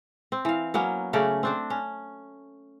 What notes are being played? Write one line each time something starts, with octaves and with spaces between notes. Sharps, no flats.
C4
E3 F5
F#3 A#3 B3 C#4
C#3 A3 C#4 D5
C4 D4 C5
C#4